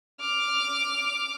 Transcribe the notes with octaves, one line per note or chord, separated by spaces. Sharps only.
D6 F6